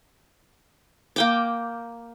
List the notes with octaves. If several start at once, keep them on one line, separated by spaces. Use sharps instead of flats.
A#3 G5 D6